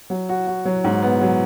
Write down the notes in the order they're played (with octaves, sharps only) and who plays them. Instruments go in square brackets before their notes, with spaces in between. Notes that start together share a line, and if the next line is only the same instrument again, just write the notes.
[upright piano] F#3
F#4
F#4
F#3
G#2
B3
F#3